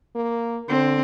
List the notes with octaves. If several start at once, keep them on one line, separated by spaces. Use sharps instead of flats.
A#3
D3 C4